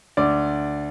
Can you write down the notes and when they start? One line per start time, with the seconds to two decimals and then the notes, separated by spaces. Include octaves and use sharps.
0.17 D2 D5